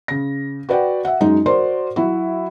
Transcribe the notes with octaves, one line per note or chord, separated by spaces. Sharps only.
C#3 A#6
F#4 B4 D5 F#5 G5
E5 F#5
F#2 G#3 D#4
F#4 A#4 C5 D5 C6
F#3 E4 F#4